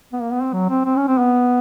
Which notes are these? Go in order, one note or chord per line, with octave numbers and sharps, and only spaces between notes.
B3
A#3
B3
C4
F#3
C4
C4
C#4
C4
B3